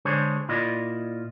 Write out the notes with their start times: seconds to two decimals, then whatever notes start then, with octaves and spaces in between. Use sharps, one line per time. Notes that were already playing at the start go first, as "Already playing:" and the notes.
0.05 D3 G#3 D4 G#4 C5 C#5
0.48 A#2 E4 F4 D5 D#5